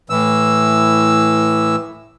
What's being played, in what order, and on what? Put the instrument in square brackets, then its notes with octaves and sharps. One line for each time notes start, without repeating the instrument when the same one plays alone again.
[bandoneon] A2 E3 E6